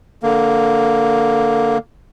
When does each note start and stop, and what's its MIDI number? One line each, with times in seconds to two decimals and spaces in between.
0.23 1.78 50
0.23 1.78 58